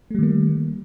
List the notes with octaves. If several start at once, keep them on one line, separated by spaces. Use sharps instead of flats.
D#3 G3 A3 A#3